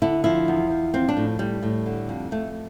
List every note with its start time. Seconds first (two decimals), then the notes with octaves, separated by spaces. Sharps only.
0.02 D3 E4
0.24 F3 E4
0.48 E2
0.70 F3
0.94 F3 C4
1.09 D4
1.17 A2
1.39 A2 G3
1.62 A2
1.86 D3
2.09 F2
2.31 F2 A3